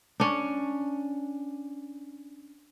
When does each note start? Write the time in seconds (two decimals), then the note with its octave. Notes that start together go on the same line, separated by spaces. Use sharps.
0.20 C#4 D4